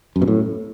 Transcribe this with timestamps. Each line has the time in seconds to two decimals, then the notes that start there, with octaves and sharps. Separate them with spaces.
0.16 F#2
0.22 B2
0.28 A2